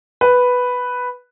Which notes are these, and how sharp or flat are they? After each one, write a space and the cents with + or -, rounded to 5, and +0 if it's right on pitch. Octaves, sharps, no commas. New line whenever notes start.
B4 +0